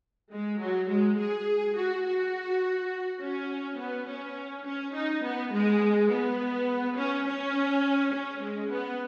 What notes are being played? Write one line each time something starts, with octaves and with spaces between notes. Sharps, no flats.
G#3
F#3
G#3
G#4
F#4
F#4
C#4
B3
C#4
C#4
D#4
B3
G#3
B3
C#4
C#4
C#4
G#3
B3